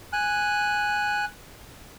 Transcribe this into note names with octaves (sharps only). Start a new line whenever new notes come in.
G#5 F#6